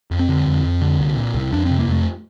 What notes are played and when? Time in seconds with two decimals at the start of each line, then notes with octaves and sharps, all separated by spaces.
0.11 F2
0.19 C4
0.29 D3
0.46 F2
0.63 F2
0.81 D3
0.99 C2
1.17 A#2
1.34 C2
1.52 F2 D4
1.65 C3 C4
1.79 A#3
1.88 F2 A3